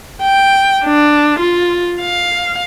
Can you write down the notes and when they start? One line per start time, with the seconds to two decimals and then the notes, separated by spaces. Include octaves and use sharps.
0.22 G5
0.85 D4
1.39 F4
2.01 F5